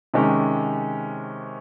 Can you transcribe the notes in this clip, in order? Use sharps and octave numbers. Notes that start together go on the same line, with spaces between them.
C3 D#3 G#3 C#4